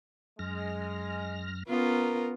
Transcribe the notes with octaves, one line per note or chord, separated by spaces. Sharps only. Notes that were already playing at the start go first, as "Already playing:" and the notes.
F#2 G#3 F6 A#6
B3 C#4 F4 A#4